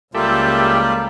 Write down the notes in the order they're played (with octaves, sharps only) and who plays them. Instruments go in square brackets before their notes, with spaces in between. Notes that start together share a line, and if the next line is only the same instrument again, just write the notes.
[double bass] C#2 [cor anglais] G3 [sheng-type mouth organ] A#3 F4 [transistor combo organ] G4 A4 E5